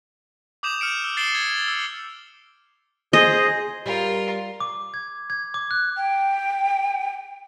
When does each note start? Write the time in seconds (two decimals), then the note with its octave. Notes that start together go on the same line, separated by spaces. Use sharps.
0.63 D6 D#6 G6 E7 F7
0.80 F6 C#7 D7 E7
1.01 E6 F6 D7
1.17 A6 C7 D7 E7 F#7 G7
1.35 G#6
1.68 E6
3.13 G#4 C5 D#5
3.86 G3 F4 A#4
4.60 D6
4.94 G#6
5.30 G#6
5.54 D6
5.71 F#6
5.97 G5